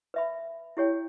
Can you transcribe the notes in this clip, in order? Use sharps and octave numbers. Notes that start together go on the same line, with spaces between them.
B4 E5 B5
E4 G4 C#5 G5